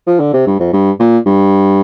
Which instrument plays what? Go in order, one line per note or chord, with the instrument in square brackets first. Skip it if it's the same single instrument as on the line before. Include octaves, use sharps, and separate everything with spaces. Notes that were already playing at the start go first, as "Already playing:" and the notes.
[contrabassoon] F3
D3
C3
G2
F2
G2
A#2
G2